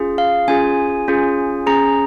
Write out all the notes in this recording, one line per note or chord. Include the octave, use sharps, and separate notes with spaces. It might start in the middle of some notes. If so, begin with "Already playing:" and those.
Already playing: C#4 F4 G#4
F5
C#4 F4 G#4 G#5
C#4 F4 G#4
C#4 G#4 A#5